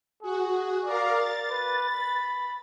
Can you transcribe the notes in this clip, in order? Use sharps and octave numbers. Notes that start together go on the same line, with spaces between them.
F#4 G#4
A#4 D5 F5
A6
B4
B5